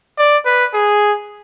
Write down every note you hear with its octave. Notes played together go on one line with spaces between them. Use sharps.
D5
B4
G#4